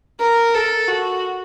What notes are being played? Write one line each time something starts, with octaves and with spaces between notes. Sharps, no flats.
A#4
A4
F#4